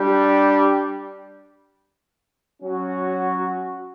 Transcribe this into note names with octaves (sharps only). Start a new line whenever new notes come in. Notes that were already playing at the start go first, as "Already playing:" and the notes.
Already playing: G3 D4 G4
F#3 C#4 F#4